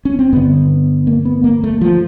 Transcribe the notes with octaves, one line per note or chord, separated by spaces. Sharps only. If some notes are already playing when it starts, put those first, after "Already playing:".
C#4
C4
G2 D3 B3
A#3
B3
A#3
A3
F3